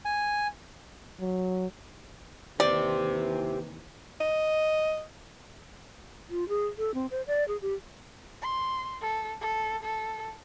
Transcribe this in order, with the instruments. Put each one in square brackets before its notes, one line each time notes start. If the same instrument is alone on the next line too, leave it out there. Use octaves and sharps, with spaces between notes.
[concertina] G#5
[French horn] F#3
[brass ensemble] D#2 C3 E3 [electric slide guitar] G4 C5 [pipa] D5
[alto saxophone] D#5
[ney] F4
G#4
A4
C4
C5
D5
G#4
G4
[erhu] C6
A4
A4
A4